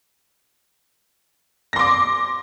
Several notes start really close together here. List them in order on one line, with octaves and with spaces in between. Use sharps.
A#6 C6 D6